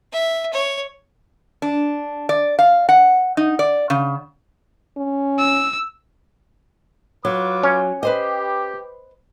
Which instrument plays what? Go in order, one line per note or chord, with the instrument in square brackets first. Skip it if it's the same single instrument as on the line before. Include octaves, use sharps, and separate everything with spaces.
[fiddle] E5
C#5
[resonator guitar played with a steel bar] D4
D5
F5
F#5
D#4
D5
C#3
[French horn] C#4
[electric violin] E6
[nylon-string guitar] F#3 [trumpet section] F4 B4 D6
[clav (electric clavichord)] C#4 C#5
[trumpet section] G4 [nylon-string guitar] B4 C5 D#5